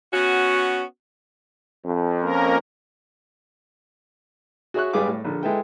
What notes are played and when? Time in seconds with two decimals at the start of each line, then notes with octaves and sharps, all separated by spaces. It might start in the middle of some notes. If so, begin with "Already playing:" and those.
0.13 B3 C#4 F#4
1.85 F2
2.21 A#3 C#4 A#4
4.74 F#4 G#4 C#5 E5 C#6 F#6
4.93 G#1 G3 G#4 B4 F5 D6
5.07 A2
5.25 A#1 D3
5.43 G#3 E4 A4 B4 G5